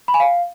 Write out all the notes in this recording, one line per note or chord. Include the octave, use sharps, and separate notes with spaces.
B5
G#5
F5